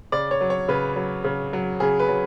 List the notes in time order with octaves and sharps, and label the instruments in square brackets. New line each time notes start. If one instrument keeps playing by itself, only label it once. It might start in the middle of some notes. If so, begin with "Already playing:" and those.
[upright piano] C#3 D5
C#5
F#3
C#5
C#3 B4
F#3
C#3
F#3
C#3 G#4
B4
F#3